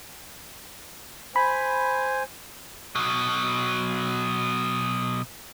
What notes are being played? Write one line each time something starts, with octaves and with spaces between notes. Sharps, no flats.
C5 G#5 B5
B2 F#3